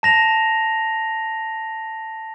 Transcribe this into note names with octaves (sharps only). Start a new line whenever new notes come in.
A5 A#6 F7